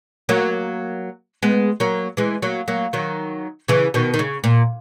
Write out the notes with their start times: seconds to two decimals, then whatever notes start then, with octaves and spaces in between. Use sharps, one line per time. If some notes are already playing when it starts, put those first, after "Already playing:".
0.29 F#3 A#3
1.42 G#3 B3
1.80 F#3 A#3
2.17 E3 G#3
2.42 F#3 A#3
2.68 F#3 A#3
2.93 D#3 F#3
3.68 C#3 E3
3.94 B2 D#3
4.14 D#3
4.19 C#3
4.44 A#2